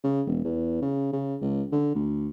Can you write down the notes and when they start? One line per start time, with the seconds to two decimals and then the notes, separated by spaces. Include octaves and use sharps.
0.04 C#3
0.27 E1
0.45 E2
0.82 C#3
1.13 C#3
1.41 C#2
1.72 D3
1.95 D2